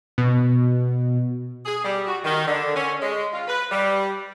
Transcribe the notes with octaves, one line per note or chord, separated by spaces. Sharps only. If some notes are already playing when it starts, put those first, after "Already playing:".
B2
G#4
G3
F#4
D#3
D3
C#4
G#3
F4
B4
G3